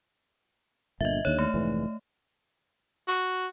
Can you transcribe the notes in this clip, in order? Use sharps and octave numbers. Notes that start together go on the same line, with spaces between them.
G1 A#2 D3 D#5 E5
D#2 D3 C#5
A3
F1 G#2 E3
F#4